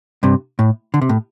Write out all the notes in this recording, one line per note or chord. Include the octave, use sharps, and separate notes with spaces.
G2 C3
A2
D3
C3
A2